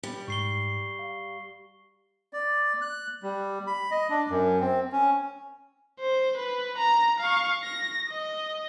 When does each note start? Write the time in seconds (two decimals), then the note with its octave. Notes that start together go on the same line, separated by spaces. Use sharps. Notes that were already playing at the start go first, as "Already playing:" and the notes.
0.03 G3
0.28 G#2 C#6 C7 G7
0.99 F5
2.33 D5
2.81 F#6
3.23 G3
3.67 B5
3.91 D#5
4.10 D4
4.30 F#2
4.60 C4
4.92 C#4
6.00 C5
6.37 B4
6.78 A#5
7.20 F5 C#6
7.63 A#6
8.10 D#5